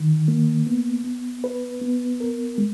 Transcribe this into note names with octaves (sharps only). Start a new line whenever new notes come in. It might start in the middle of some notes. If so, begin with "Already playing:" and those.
Already playing: D#3
A#3
B3
B3
B4
B3
A#4
G#3